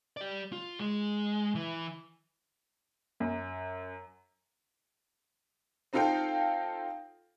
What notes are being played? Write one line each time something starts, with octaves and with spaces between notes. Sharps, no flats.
G4 D5
F4
G#3
E3
F#2
C4 D#4 F4 A4 F5 G5